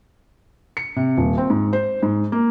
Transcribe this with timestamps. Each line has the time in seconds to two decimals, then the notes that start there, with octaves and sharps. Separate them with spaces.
0.77 C#7
0.96 C3
1.17 D#1
1.38 C4
1.50 G#2
1.73 C5
2.03 G#2
2.32 A#3